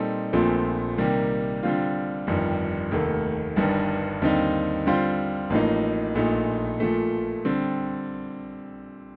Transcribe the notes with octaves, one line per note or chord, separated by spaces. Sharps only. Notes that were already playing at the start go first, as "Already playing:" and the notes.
Already playing: A#2 G3 C4 D#4 A4
A#1 A#2 F3 A3 C4
C3 D#3 G3 A#3
D3 G3 C4 F4
G1 F2 D#3 G3
F1 D#2 D#3 A3
G1 G2 D#3 G3
D#2 D3 G3 C4 D#4
D3 G3 C4 F4 C5
A1 A2 F3 A#3 D#4
A#1 A#2 A3 D#4
A#2 F3 A3
D3 G3 C4